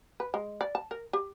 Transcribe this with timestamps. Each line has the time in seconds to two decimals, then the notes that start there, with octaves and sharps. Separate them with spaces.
0.20 B4
0.34 G#3
0.61 D5
0.75 A5
0.91 A#4
1.13 G4